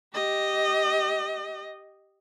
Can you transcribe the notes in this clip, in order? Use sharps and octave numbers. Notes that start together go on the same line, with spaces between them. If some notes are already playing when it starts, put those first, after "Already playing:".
G4 D#5